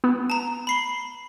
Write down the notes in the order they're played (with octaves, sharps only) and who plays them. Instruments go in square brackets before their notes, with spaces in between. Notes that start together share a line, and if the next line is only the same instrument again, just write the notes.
[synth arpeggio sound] B3
[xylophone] A5 A#5
B5 C7 G7